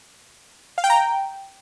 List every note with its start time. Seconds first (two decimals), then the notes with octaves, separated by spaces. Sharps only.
0.78 F5
0.84 G5
0.90 A#5
0.96 G5